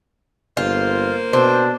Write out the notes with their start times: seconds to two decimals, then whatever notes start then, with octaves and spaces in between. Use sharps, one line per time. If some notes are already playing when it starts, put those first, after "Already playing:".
0.57 G1 A#3 F4 C5
1.33 B2 C4 D4